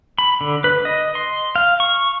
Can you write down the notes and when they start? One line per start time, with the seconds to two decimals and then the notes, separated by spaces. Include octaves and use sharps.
0.18 B5
0.41 D3
0.64 B4
0.85 D#5
1.15 C6
1.56 F5
1.80 C#6